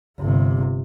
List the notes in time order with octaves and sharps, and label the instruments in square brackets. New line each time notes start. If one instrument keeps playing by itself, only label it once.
[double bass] G1 C3